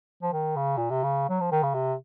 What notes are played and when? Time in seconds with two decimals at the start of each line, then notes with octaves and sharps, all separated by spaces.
0.22 F3
0.33 D#3
0.56 C#3
0.77 A#2
0.91 C3
1.04 C#3
1.29 F#3
1.41 F3
1.52 D#3
1.63 C#3
1.74 C3